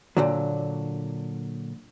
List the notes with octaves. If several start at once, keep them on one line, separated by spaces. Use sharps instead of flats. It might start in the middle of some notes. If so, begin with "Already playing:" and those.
A#2 D3 F#3